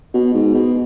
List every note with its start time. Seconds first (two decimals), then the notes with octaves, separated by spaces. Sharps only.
0.14 B2
0.34 G#2
0.54 B2